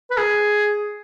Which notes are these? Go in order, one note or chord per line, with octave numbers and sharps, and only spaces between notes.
B4
G#4